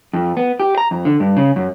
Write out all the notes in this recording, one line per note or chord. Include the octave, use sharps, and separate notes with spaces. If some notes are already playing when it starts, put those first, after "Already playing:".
F2
B3
G4
A#5
F2
D3
G2
C#3
F#2